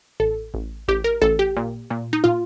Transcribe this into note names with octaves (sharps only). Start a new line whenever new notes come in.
A1 A4
A1
A1 G4
A#4
A1 A4
G4
A#2
A#2
D#4
A#2 F4